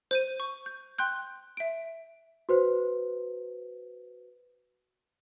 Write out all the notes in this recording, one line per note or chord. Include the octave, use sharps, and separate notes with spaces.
C5 G6 D#7
C#6
G6
G5 C6 F#6 G6
E5 D7
F#4 B4 C5